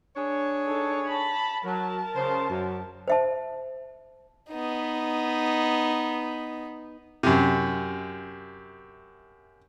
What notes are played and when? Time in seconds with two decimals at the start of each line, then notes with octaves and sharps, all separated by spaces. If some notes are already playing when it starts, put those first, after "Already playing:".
0.16 D4 G#4 C#5
0.66 D#4 A4
1.06 A5 B5
1.64 F#3 A#4 A5
2.16 C#3 C5
2.49 F#2
3.08 C5 E5 A5
4.50 B3 D#4
7.23 F#2 C3